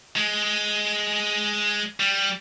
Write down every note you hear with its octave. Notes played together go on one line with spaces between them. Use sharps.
G#3
G3